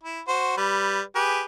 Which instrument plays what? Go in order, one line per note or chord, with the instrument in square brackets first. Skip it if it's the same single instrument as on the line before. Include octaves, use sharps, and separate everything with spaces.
[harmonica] E4
F#4 C5
G3 B4
G4 G#4 B4